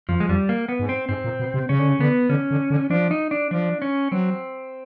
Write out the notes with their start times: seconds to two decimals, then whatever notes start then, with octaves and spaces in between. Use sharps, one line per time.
0.09 F2 F3
0.20 G#3
0.29 F2 G3
0.49 A#3
0.69 B3
0.80 G#2
0.89 C4
1.09 G#2 C4
1.24 A#2
1.40 B2
1.54 C3
1.69 C#3 C#4
1.79 D3
1.88 C#3
1.99 D3 B3
2.29 D3 C#4
2.51 D3
2.70 D3
2.90 F3 D4
3.11 D#4
3.31 D4
3.51 F3 D4
3.82 C#4
4.12 F#3 C4